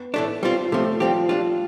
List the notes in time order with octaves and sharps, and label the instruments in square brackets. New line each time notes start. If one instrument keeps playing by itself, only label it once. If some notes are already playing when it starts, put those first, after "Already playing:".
Already playing: [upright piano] B3
[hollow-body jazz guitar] A2 E3 A3 D4
G3 C4 F4
[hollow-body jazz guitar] C3 F3 C4 [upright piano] A3
[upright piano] F3 [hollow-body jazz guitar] G3 C4 G4
[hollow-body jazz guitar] G3 D4 F4